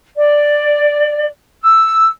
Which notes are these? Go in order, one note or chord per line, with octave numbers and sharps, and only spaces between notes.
D5
E6